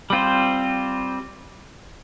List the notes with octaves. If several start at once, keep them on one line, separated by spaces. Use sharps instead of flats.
G3 C4 F4 C5